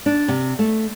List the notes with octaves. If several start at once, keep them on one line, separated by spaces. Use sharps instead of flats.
D4
C3
A3